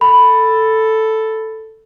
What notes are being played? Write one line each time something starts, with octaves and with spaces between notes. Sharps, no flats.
A4 B5